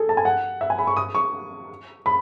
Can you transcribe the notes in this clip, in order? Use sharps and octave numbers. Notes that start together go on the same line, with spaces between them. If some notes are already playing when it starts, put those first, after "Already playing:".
Already playing: G#4 A4
A5
G#5
F#5
E5
G#5
B5
C#6
D#6
C#6
B5